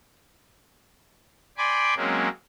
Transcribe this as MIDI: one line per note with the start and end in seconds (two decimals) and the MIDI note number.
1.58 1.94 74
1.58 1.94 79
1.58 1.94 80
1.58 1.94 83
1.58 1.94 84
1.58 1.94 86
1.96 2.29 54
1.96 2.29 56
1.96 2.29 58
1.96 2.29 60
1.96 2.29 61